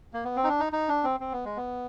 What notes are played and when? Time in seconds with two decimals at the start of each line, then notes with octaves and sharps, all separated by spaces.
0.14 A#3
0.25 B3
0.37 C4
0.44 D#4
0.48 D4
0.60 D#4
0.73 D#4
0.89 D4
1.04 C4
1.20 C4
1.32 B3
1.45 G#3
1.56 B3